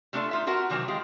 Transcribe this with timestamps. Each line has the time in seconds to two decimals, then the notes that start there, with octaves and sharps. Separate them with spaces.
0.13 G3 A3 D4 E4 F4 A4
0.31 D#4 F4 E5
0.47 F4 F#4 A#4 B4 F#5
0.70 C3 D#3 E3 F#3 C4
0.88 G#3 F4 G4